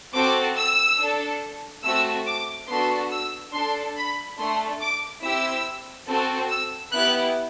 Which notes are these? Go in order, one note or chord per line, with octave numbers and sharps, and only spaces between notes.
C4 F#4 A4 D6
E6
D4 A4
A3 C4 F#4 A4 E6
D6
B3 D4 F#4 A4 C6
E6
D4 A4 C6
B5
A3 D4 A4 C6
D6
C4 E4 G4 E6
C4 F#4 A4
E6
B3 E4 G4 F#6